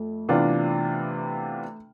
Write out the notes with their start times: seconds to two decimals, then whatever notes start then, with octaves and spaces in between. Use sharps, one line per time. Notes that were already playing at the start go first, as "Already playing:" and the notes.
Already playing: F2 A3
0.29 C3 E3 B3 D4 F4